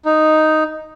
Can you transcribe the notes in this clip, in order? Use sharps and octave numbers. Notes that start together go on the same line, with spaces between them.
D#4